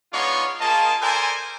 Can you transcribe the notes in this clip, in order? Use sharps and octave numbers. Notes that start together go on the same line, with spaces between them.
G#3 B3 D4 D#4 F4 C#5
A#3 F4 G#4 A#4 D#5 A5
A4 A#4 C5 D5 G#5